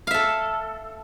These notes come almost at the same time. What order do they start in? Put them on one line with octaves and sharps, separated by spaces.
F5 E5 A4